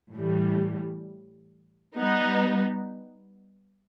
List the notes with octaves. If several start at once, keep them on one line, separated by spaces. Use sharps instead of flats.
A2 E3 G3
G3 B3 D#4